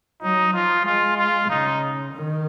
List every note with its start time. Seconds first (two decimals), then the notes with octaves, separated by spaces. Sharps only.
0.22 F#3 D#4
0.53 F3 F4
0.86 G#3 F4
1.17 F4
1.49 C#3 D#4
2.13 D#3